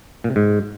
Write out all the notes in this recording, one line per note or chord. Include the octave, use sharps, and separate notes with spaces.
A#2
C3
G#2